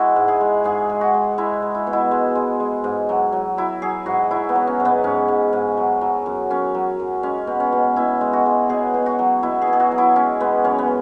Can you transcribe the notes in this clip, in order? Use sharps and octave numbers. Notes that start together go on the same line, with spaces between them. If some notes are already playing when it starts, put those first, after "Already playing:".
Already playing: G#3 E4 F#4
G#2
G#4
G#3
G#2 G#4
G#3
F#4
G#3
G#3 E4
G#3
E4
B2
E4
G#3
G#3
G#3
G#2
F#3
F#3
F#3 E4
F#3 G#4
G#2 F#4
F#3 E4
B3
F#3
C#4
G#2
B3
G#2 C#4
G#2
G#2
F#3
F#3
F#2
F#2 C#4
F#3
F#2
G#3 C#4
B2
C#4
B2
B2 E4
G#3
F#4
G#3
B2 G#4
B2
F#4
F#3
B2 E4
G#4
B2
G#4
F#4
F#3
E4
G#3 C#4
G#3 B3
F#2 C#4
B3